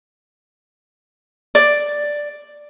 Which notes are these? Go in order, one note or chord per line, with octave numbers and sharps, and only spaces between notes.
D5